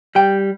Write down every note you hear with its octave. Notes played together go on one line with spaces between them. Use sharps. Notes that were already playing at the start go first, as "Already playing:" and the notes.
G3 G5